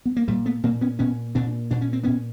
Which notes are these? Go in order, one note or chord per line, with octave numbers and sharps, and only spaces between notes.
B3
A#3
A#2 G3 A3
A3 B3
A#2 A#3 C4
B3 C#4
A#2 B3 C#4
A#2 C4 D4
A#2 D4
C#4
C4
A#2 B3 C#4